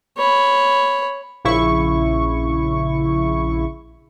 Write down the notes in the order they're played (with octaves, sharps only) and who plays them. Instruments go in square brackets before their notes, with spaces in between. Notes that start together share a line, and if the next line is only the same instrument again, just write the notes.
[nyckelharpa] C#5 B5
[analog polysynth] A#1 C#3 E4 C#6